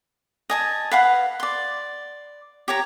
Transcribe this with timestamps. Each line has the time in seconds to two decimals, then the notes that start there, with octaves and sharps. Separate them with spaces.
0.50 D#5 G#5 A5
0.91 B4 F5 F#5
1.40 D5 C6
2.68 G4 C#5 A#5